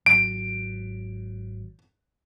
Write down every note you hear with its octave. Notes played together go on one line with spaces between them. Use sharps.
G#1 F#3 D7